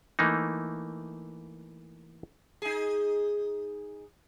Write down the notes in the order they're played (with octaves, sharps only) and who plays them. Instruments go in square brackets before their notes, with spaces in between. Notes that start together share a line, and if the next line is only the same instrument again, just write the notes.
[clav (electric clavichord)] E3 A3 A#3 D#4
[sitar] D#4 G#4